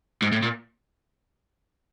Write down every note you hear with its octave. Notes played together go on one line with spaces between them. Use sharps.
G#2
A2
A#2